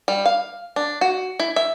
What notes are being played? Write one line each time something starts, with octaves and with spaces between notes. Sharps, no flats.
G3
F5
D4
F#4
E4
E5